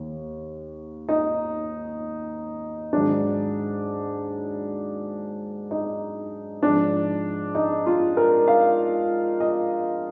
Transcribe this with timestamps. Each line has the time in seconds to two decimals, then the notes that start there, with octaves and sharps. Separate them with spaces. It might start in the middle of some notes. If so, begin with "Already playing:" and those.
Already playing: D#2
1.09 D#4
2.93 G#2 D#3 F#3 D4
5.71 D#4
6.63 G#2 F3 D4
7.55 D#4
7.86 F4
8.17 A#4
8.48 F5
9.40 D#5